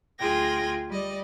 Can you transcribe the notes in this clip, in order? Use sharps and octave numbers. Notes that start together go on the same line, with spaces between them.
D2 F4 G#4 G5 G#6 A#6
G3 D5 D#5